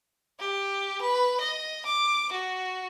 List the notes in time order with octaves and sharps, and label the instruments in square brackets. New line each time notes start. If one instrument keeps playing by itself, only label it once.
[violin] G4
B4
D#5
D6
F#4